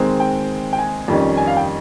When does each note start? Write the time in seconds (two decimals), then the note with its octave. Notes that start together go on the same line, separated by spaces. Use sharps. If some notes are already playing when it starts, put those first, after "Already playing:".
Already playing: D#3 G#3 C4
0.20 G5
0.73 G5
0.78 G#5
1.08 F2 D#3 G3 C#4
1.37 G#5
1.47 F5
1.57 G5